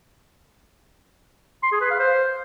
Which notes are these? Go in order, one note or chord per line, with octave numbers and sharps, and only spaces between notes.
C6
G#4
B4
F5
C5